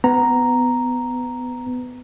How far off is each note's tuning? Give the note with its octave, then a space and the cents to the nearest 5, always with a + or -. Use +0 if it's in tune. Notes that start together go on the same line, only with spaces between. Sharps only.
B3 +20 A#5 +0